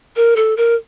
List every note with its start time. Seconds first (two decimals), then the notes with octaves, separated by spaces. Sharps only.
0.16 A#4
0.36 A4
0.57 A#4